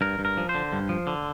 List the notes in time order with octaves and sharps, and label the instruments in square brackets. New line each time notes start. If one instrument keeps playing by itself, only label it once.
[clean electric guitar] G2 A#4
G2
A#4
F3
C5
D3
G2
F3
D3